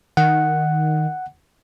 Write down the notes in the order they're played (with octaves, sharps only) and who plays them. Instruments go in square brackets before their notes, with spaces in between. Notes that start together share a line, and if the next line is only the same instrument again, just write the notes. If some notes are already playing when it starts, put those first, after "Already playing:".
[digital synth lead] D#3 [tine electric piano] F#5